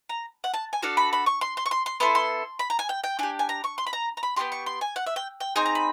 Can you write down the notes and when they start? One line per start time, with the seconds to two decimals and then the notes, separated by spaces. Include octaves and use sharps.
0.09 A#5
0.44 F#5
0.54 A5
0.73 G#5
0.82 D4 F#4 A4 F5
0.97 B5
1.13 B5
1.26 C#6
1.41 C6
1.57 C6
1.66 C#6
1.71 C6
1.86 C6
2.00 B3 E4 A4 C6
2.15 C6
2.59 B5
2.70 A#5
2.79 G#5
2.89 G5
3.04 G5
3.19 D4 G4 G#5
3.39 G#5
3.49 A#5
3.64 C#6
3.78 C6
3.87 B5
3.93 A#5
4.17 A#5
4.23 B5
4.36 B3 D4 G4 C6
4.52 C#6
4.66 C6
4.81 G#5
4.96 F#5
5.06 E5
5.16 G5
5.40 G5
5.56 C4 D#4 G#4 G#5
5.66 A#5
5.75 B5